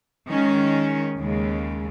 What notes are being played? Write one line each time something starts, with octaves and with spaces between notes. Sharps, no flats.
D#3 G#3 C#4
D#2 C#3 G#3